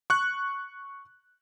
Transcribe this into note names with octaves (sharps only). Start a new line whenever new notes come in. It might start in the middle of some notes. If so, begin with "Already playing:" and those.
C#6 F#6